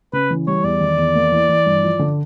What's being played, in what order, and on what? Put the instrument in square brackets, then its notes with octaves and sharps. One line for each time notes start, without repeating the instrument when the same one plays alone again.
[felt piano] C#3 [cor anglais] B4
[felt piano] E3
[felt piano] G3 [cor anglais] C#5
[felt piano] E2 [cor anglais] D5
[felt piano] D#3
E2
A#3
E3
E3
G2
F3
D3